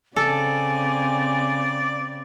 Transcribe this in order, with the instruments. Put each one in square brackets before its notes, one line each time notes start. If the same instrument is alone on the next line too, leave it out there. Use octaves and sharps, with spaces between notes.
[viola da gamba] C#3 C4 [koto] A4 [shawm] D5 [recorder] G#5